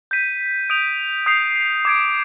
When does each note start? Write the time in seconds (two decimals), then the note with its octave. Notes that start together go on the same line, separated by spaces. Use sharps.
0.11 G6 B6 D#7
0.70 D#6 G6 D7 F7
1.26 D#6 G6 C7 F7
1.85 D6 G#6 D7